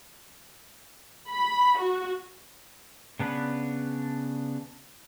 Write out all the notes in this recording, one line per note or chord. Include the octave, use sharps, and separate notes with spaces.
B5
F#4
C#3 B3 D4 B4